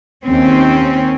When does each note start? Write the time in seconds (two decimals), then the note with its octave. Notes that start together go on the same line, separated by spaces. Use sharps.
0.24 D#2 C4 C#4